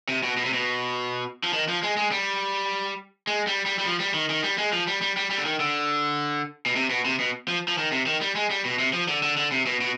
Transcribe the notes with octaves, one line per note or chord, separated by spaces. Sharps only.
C3
B2
B2
C3
B2
F3
D#3
F3
G#3
G#3
G3
G#3
G3
G3
G3
F3
G3
D#3
D#3
G3
G#3
F3
G3
G3
G3
G3
D3
D#3
D3
B2
C3
B2
C3
B2
F3
F3
D#3
C3
D#3
G3
G#3
G3
B2
C3
F3
D3
D3
D3
C3
B2
B2